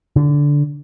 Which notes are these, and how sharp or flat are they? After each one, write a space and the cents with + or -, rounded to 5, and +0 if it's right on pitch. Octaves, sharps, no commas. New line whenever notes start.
D3 -15